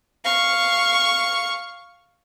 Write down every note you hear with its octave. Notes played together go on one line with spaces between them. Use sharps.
F5 C#6